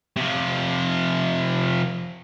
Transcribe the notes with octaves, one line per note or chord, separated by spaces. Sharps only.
C3 F3